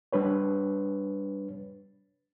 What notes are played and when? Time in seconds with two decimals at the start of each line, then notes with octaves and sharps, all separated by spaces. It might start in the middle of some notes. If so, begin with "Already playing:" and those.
0.13 G3 D4 B4 C#5